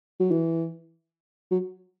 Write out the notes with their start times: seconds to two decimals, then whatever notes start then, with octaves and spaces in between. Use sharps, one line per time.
0.20 F#3
0.31 E3
1.51 F#3